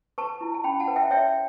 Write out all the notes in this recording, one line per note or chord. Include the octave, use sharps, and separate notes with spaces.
B4 A5 C#6
E4
A5
C#4 G5 B5
F#5 A5
B4
E5 G5
C#5 E5 G5